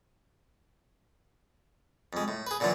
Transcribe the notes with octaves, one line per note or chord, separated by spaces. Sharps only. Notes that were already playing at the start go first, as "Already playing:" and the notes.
F2 G#3
A2
G#4 B4
A#2 D3 E3 F#3 D4